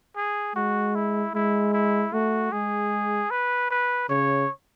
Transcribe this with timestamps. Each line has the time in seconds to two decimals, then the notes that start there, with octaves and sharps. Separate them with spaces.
0.16 G#4
0.56 G#3 F#4
0.95 E4
1.35 G#3 E4
1.73 E4
2.13 A3 F#4
2.52 G#3 G#4
3.30 B4
3.71 B4
4.09 C#3 C#5